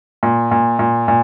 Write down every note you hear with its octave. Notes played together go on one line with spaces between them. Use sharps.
A#2
A#2
A#2
A#2